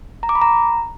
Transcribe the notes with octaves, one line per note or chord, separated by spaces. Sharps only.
A#5
D6
B5
A#5